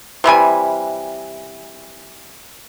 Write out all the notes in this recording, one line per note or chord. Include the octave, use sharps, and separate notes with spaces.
C3 E3 G3 G#5